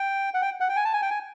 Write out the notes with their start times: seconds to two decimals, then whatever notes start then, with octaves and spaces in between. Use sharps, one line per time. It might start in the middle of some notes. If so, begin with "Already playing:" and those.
Already playing: G5
0.34 F#5
0.42 G5
0.60 F#5
0.69 G5
0.76 G#5
0.85 A5
0.93 G#5
1.02 G5
1.11 G#5